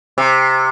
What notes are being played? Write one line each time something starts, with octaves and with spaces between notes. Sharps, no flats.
C3